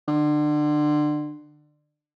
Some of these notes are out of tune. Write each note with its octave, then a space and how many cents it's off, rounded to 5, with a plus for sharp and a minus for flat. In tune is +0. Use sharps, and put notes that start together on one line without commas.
D3 +30